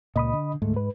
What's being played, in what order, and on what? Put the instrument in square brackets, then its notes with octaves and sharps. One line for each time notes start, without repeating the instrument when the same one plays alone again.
[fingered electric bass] C#2 A#2 [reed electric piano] D#5 B5 D#6
[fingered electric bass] D3
[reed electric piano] D2 A3 [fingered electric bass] G#2
[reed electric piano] B4